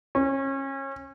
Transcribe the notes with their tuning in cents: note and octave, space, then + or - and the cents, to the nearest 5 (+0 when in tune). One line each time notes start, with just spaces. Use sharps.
C#4 -30